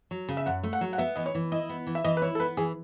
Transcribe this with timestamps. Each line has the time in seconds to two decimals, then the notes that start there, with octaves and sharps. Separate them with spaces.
0.11 F#3
0.28 C#3
0.37 E5
0.46 F#2 F#5
0.63 A3
0.73 F#5
0.81 F#3
0.93 F#5
0.98 B3 E5
1.16 E3 D#5
1.26 C#5
1.35 E3
1.52 E4 D#5
1.69 B3
1.87 E3
1.95 E5
2.04 E3 D#5
2.17 B4
2.22 E4 C#5
2.35 A4
2.40 B3 B4
2.57 E3 G#4